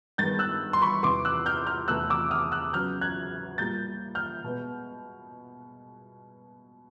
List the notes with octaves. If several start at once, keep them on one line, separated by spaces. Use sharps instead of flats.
G2 D#3 G#3 B3 G6 A6
E6 F#6
C6
B5 C#6
E2 C3 E3 C6 D6
E6 F#6
F6 G6
F6 G6
E2 C3 E3 A3 E6 F#6
D6 E6
D#6 F6
E6 F#6
C#3 F#3 B3 F6 G6
F#6 G#6
A#2 G3 A#3 G6 A6
F6 G6
B2 G#3 B3